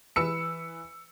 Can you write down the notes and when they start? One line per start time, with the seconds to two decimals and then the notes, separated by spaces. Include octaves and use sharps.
0.16 E3 B4 E6 C#7